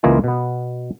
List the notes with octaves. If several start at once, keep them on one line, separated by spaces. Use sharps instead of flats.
C#2 E3 A#3 F4 D#5 G#5
B2 B3